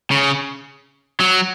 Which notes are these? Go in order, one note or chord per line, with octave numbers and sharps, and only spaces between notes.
C#3
F#3